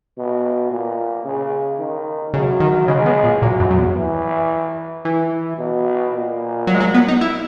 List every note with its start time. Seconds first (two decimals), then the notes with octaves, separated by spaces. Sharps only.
0.17 B2
0.71 A#2
1.25 C#3
1.79 D#3
2.34 C#3 F#3
2.60 D#3
2.88 C#3 G#3
3.06 B2
3.24 A#2
3.42 A#2 F#3
3.60 F#2
3.70 F#2
3.78 E2
3.96 E3
5.05 E3
5.58 B2
6.13 A#2
6.67 F#3
6.74 G#3
6.80 F#3
6.94 B3
7.08 D#4
7.21 E4